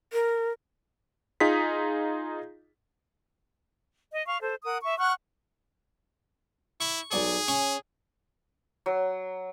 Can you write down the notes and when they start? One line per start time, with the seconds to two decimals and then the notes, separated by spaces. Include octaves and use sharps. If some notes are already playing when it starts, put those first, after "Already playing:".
0.13 A#4
1.40 D#4 F4 G#4 B6
4.12 D#5
4.27 F5 C#6
4.41 A4 C5
4.64 A#4 F#5 D#6
4.84 E5 C#6
4.99 F#5 C#6 F6 F#6
6.80 E4 C#6
7.12 B1 G#4 D5 C#6
7.48 C#4 C#5 G#5
8.86 F#3